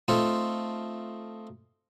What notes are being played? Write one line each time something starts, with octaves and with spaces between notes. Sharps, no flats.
A3 C4 D#4 F4 A4